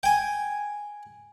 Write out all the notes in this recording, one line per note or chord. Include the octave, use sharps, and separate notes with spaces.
G5 G#5